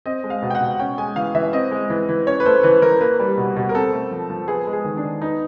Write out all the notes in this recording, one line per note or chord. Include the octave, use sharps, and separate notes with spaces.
C4 D#5
G#3
F5
B2
G5
F#5
B2
C#4 G5
G#3 G#5
E3 F5
E3 E5
C4 D#5
G#3
E3
E3
C#4 C#5
B4
A3 C5
E3 B4
E3 A#4
A#3 B4
G3
B2
B2
A#4
C4 A4
A3
F3
F3
B3 G#4
G#3
G#4
D#3
D4
D#3
B3 D#4